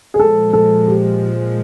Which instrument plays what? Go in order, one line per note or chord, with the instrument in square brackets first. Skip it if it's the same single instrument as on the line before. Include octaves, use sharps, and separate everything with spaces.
[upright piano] G#4
[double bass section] A#2 F3 G#3 [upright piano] A4
[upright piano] A4
G4